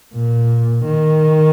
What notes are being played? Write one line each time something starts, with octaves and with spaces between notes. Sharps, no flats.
A#2
D#3